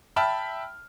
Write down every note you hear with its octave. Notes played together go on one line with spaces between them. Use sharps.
E5 G5 A5 B5 F6